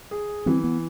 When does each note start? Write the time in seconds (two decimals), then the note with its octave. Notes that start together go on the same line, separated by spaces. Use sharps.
0.11 G#4
0.46 E3 C4
0.64 B3